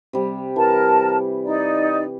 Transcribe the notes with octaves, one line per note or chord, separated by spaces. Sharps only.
C3 G3
E3 A#4 A5
D#4 D5